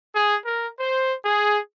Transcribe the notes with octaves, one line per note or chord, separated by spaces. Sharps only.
G#4
A#4
C5
G#4